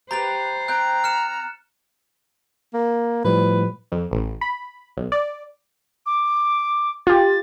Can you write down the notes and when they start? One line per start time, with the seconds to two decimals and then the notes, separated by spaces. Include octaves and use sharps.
0.11 G4 B4 C5 A#5 A6 F7
0.68 C4 G5 A#5 F#6
1.04 F6 C#7 E7
2.74 A#3
3.25 A2 F3 G3 B4
3.92 F2
4.11 A1
4.41 B5
4.97 B1
5.12 D5
6.06 D6
7.07 F4 G4 A6